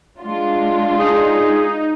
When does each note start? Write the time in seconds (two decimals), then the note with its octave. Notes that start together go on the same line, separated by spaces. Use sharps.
0.21 G#3 D4 F4
0.99 D#4 G#4